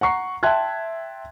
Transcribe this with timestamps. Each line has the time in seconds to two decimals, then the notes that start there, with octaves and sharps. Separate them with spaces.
0.01 F#5 A#5 C#6 C7
0.43 E5 G5 A5 C6 F#6 G#6